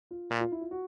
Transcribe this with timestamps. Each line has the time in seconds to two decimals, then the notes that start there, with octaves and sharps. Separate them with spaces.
0.11 F4
0.31 A#2
0.41 F4
0.52 E4
0.61 F4
0.71 F#4